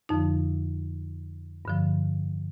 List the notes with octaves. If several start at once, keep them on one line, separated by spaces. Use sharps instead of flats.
F2 D3 F3 D#4
G2 D3 F3